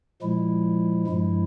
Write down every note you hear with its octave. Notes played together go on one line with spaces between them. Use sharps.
A#2 F3 G#3 E4
G2 F3 G#3 E4